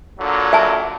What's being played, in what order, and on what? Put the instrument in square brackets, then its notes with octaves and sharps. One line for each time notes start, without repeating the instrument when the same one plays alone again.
[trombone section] A#2 D3 F#3
[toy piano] E5 G#5 A5